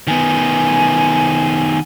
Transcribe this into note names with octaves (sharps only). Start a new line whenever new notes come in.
D#3 B3 G#5